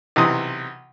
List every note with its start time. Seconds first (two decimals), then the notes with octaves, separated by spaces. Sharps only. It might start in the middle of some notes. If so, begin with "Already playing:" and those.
0.16 B1 C3 E3 D#6